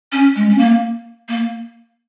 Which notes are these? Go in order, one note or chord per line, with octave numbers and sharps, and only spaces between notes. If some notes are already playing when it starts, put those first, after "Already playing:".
C#4
G#3
C#4
A#3
A#3